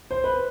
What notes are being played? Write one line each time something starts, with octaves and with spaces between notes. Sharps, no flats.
C5
B4